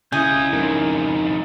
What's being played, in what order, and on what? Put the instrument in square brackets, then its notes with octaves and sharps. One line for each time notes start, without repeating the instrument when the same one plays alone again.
[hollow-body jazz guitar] C#3 E4 [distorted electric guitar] C#4 D#5 [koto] G#4 [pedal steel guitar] G6
[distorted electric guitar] F2 G#2 [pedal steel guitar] D#4 A#4